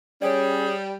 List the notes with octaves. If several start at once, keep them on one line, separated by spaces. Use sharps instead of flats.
G3 C#4 G#4 C#5 D5